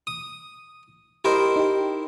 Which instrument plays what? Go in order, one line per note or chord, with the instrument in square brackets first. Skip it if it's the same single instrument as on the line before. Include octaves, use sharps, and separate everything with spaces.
[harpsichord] D#6
[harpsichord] E4 A#4 C5 [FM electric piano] G4 D#5
[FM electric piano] D#4 G4